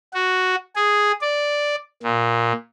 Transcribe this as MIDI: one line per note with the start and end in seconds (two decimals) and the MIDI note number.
0.14 0.55 66
0.76 1.12 68
1.22 1.76 74
2.03 2.52 46